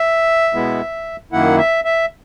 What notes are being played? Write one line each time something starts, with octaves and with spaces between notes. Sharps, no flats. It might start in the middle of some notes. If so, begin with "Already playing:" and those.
Already playing: E5
B2 G#3 B3 E4
F#2 D#3 A#3 E4 F#5
E5
E5